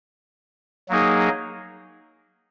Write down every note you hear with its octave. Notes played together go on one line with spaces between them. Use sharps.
F#3 A#3 D#4 G#4